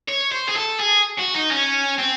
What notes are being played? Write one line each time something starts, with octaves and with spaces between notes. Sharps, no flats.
C#5
C5
G#4
A4
G#4
F#4
D#4
C#4
C4